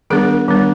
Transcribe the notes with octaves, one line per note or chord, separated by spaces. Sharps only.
D#3 G3 B3 D4 G#4 A#4
D#3 G3 B3 D4